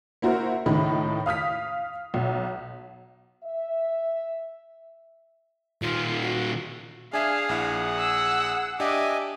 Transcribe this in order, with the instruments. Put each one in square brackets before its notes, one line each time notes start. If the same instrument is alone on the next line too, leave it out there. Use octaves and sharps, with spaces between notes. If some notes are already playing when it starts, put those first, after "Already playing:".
[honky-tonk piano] A#3 E4 F#4 A#4 C5
C#2 A2 D#3 D#4 B5
F5 D#6 F6 B6
B1
[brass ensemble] E5
[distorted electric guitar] A#2 D#3 [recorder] F4
[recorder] F#4
[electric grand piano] D4 E5 [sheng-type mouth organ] G#4 [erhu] F5 [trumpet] G#5
[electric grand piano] A#1 E4 [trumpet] F#5
[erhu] E6
[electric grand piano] D4 G4 [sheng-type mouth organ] D#5 E5 G#5 [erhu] D6